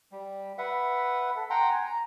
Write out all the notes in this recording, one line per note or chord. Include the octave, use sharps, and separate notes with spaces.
G3
B4 E5 F#5
A4
F#5 G5 A#5 C6
G#5
A#5